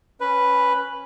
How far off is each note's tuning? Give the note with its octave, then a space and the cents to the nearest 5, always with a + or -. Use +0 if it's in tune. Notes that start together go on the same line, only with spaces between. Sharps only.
C#4 -5 B4 +0